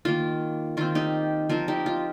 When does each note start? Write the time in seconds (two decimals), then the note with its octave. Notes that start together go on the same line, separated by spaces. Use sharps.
0.05 D#3 A#3 F4
0.77 D#3 C4 F4
0.95 D#4 G4
1.49 F3 C4 F4 A#4
1.68 D#4 G4
1.86 F4